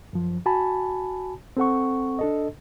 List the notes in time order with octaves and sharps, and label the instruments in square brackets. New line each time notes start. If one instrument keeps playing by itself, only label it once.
[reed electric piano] F#2 F3
F#4 G#5 A5 B5
C4 A4 F#5 C#6
D4 A4 D#5